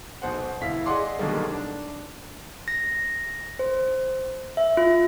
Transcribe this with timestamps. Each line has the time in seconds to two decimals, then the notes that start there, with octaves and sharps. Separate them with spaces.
0.22 B1 B2 C5 F#5
0.61 G1 E4 F5 B6
0.86 G#4 D5 D#5 F#5 C6 D6
1.19 B2 D3 D#3 F#3 G3 A#3
1.51 D4
2.68 A#6
3.59 C5
4.57 E5
4.77 F4